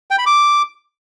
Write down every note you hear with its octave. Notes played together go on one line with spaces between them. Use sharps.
G5
B5
D6